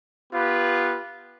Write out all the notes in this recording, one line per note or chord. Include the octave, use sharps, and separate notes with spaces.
B3 F4 G4 B4